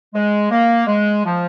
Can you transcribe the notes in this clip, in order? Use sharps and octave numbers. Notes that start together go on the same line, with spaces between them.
G#3
A#3
G#3
F3